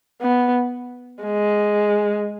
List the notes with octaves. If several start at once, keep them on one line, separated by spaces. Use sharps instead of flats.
B3
G#3